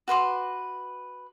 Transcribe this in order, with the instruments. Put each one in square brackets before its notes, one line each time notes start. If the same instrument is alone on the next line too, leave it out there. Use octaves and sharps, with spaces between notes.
[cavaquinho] F#4 B4 C6 D6